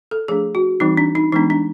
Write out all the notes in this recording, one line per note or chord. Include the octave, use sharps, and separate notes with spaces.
A4
F3 A3 D4 G#4
F#4
E3 G3 C4 D#4
D4
D#4
E3 G#3 B3 D4 D#4
D4